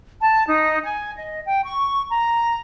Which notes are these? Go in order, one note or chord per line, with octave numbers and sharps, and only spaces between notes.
A5
D#4
G#5
D#5
G5
C#6
A#5